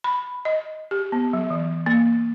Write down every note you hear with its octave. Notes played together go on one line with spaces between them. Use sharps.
B5
D#5
G4
B3
F#3
E3
A#3